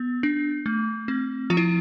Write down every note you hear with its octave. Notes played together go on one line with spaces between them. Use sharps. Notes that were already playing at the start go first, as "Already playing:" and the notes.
Already playing: B3
D4
A3
C4
F3 F4
E4